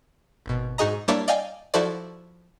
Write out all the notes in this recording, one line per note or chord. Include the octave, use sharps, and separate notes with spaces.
G#1 B2
G#2 D#4 F#4 G#4 D#5 A#5
G3 A#3 D4 E4 C#5 D5
D5 D#5 F5 G5 G#5
F3 E4 F#4 A4 C5 D5